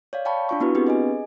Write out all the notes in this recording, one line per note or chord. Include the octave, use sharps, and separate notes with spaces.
C#5 D5 F5
D5 F5 G5 A5 B5 C#6
D4 F4 C#6
B3 D4 E4 F#4 B4
B3 C4 D4 G4 G#4 B4
G#4 D#5 G#5